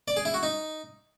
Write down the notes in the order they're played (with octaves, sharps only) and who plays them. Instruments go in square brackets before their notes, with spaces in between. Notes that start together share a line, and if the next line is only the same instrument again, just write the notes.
[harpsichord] D5
G#4
E4
F#4
D#4